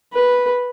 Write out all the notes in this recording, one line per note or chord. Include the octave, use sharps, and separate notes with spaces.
B4